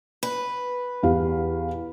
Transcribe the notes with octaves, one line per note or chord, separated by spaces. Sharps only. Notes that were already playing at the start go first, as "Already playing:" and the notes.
B4
E2 G4 F5